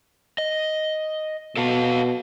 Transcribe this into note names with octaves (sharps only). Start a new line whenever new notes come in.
D#5
B2 A4 F5 A5